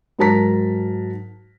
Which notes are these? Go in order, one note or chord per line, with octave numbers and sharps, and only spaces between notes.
G#2 F#3 A#4 A5 A#5 B6